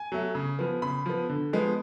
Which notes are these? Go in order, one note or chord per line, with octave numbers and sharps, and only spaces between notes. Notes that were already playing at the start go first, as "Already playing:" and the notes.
Already playing: G#5
F#3 A3
C#3
F3 B3
C#3 B5
F3 B3
D3
F3 G#3 B3